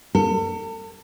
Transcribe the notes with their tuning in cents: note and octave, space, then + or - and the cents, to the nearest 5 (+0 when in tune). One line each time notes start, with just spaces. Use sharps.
A4 +40